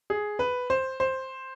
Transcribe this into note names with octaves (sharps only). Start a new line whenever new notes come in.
G#4
B4
C5
C5